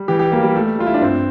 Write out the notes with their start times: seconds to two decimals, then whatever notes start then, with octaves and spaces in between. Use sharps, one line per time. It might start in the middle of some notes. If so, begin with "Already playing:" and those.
Already playing: G3
0.08 E3 G4
0.19 G4
0.32 G3 A#3
0.43 G3
0.56 G3 A3
0.79 G3 F4
0.87 E4
0.94 D4
1.01 G2 C4